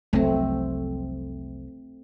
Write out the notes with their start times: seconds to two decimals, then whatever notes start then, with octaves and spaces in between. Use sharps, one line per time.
0.13 F1 C2 F#3 A3 C4